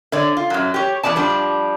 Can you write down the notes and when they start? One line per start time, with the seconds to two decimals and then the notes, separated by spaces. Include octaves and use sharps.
0.12 D3 C#5 D5
0.37 F4
0.50 F#2 F#3
0.74 G4 C#5
1.03 E2 C3 B3 D5 A5
1.16 F3 G3 D4